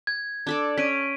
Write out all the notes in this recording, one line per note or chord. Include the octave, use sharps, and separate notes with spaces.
G#6
D4 A4 D5
C#4 B6 D7 D#7